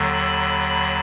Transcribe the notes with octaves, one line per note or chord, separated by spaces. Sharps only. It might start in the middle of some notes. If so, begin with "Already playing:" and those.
Already playing: D#2 D3 F#3
B5